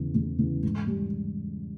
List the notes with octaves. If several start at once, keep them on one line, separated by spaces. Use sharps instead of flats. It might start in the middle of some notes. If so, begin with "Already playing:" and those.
Already playing: E2 C#3 E3
E2
C#3 E3
G#2
G3